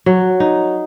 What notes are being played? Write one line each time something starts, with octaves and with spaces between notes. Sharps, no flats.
F#3
D#4